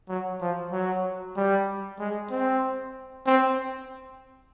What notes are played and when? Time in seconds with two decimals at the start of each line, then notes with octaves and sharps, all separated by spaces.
0.09 F#3
0.41 F3
0.72 F#3
1.37 G3
1.99 G#3
2.31 C4
3.26 C4